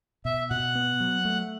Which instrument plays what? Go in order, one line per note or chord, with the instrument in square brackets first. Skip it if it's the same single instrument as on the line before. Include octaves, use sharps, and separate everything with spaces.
[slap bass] B2 [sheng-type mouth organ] E5
[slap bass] B2 [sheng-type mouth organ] F#5
[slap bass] B3
F#3
A3